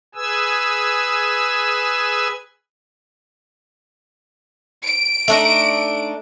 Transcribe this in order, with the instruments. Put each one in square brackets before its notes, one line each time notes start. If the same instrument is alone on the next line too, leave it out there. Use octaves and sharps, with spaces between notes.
[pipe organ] G#4 B4 G#5 E6
[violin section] D7
[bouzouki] A3 D4 D#4